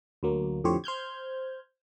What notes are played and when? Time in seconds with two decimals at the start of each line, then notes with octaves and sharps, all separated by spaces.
0.23 D2 F#3 A#3
0.64 F2 A2 D3 G4 C5 C#5
0.84 C5 F6 G6 G#6